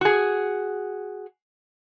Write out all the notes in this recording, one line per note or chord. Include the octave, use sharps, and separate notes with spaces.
F#4 G#4